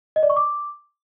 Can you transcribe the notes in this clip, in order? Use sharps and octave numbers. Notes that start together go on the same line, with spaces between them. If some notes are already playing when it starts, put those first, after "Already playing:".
D#5
D5
C#6
D6